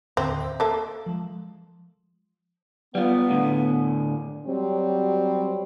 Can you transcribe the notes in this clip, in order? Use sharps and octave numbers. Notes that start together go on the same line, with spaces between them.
D#2 A2 D3 C4
E5
A#3 A4
F3 G#3
G3 B3 F4
A2 D3
F#3 G3 C4